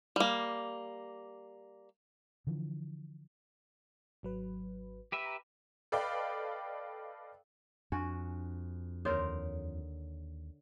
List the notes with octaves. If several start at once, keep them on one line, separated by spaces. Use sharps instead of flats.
G3 A#3
D3 E3 F3
G#1 F#3 B4
G4 B4 E5
A#5
A4 B4 D5 D#5 F5 G5
F2 D4 F#4 G#5
D#2 D3 A#4 C5 C#5 D#6